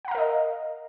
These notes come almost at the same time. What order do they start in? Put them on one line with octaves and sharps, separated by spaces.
F#5 A#5 F5 A#4 D#5